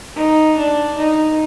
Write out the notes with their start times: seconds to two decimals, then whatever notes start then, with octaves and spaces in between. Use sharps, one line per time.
0.16 D#4
0.57 D4
0.98 D#4